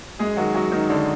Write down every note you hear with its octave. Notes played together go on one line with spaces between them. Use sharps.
F#2 G#3 G#4
D#3 F#3 F#4
F#2 F#3 F#4
D#3 G#3 D#4
F#2 D3 D4